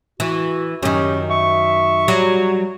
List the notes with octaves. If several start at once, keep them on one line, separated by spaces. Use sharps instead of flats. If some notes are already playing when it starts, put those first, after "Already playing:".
E3 F#4
F#2 D#3 C#4 G4
E5 C#6
F#3 G3